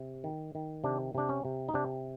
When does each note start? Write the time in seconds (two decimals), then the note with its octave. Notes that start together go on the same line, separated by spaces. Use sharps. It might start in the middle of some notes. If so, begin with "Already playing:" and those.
Already playing: C3
0.24 D#3
0.55 D#3
0.84 C3 D4
1.15 C3 D4
1.29 C#4
1.45 C3
1.68 D#4
1.74 C3 D4